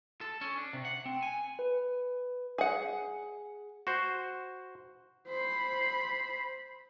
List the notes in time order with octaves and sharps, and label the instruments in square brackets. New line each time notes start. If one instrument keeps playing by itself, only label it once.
[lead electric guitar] A4
C#4
D4
C3
F#5
C4
G#5
[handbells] B4
[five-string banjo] G#4 F#5
[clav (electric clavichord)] F#4 C5
[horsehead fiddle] C5 B5